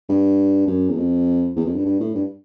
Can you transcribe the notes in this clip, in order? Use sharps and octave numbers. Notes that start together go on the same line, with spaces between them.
G2
F#2
E2
F2
E2
F2
G2
G2
A2
G2